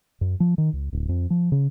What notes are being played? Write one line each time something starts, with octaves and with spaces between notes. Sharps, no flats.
F#2
F3
D#3
C#2
D1
F2
F3
C#3